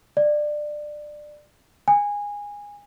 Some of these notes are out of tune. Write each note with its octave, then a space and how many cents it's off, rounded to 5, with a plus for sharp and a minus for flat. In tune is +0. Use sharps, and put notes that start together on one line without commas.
D5 +20
G#5 -20